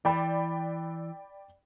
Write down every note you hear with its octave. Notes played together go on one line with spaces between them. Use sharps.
E3 D5 G5 B5